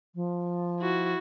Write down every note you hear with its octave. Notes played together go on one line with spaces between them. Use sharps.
F3
E4 F#4